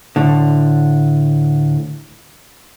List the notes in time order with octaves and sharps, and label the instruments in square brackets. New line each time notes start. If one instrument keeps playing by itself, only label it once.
[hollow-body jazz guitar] D2 A2 D3